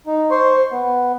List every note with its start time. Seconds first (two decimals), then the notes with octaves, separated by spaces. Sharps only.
0.07 D#4
0.31 C5 C6 C#6
0.72 B3